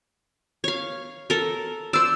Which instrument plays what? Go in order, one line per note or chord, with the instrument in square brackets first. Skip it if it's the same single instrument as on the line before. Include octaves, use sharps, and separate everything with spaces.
[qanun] C#5 F5
A4 A#4
[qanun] C5 D5 [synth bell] E6 E7